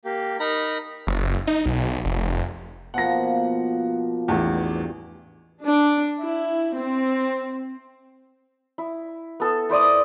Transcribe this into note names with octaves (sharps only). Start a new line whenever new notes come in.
A#3 G4
D#4 A#4 A#5 B5
F#1
D#4
B1
F1
B2 F3 A#3 F#5 A#6
A1 E2 G2 G4
D4
E4
C4
E4
B3 A4
E4 C5 D5 D#6